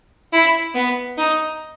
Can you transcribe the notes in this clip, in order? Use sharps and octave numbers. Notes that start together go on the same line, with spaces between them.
E4
B3
D#4